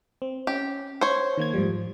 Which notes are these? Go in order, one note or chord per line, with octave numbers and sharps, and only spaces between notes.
C4
C#4 G4
C5 C#5
D#3 A#3 G#6
G#2 F3 G3